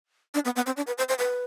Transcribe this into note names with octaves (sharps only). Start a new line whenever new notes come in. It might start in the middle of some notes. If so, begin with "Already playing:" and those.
D4
B3
B3
C4
D4
B4
C5
C5
B4